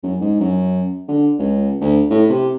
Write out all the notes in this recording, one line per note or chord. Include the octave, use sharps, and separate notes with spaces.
F#2
G#2
F#2
D3
C#2
D2
A2
C3